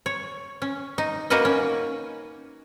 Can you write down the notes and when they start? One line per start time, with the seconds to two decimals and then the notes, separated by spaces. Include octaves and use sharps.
0.06 C#5
0.62 C#4
0.98 D#4
1.30 A#3 D#4 F#4 A#4 B4 D#5
1.45 C#4